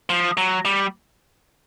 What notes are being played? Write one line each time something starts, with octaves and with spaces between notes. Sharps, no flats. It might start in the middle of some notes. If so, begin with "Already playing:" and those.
F3
F#3
G3